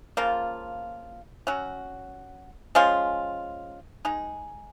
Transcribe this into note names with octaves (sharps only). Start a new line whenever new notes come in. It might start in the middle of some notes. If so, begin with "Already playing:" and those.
C#3 F3 A#3 F4
F#3 C#4 F#4
F3 G#3 C#4 F4
G#3 D#4 G#4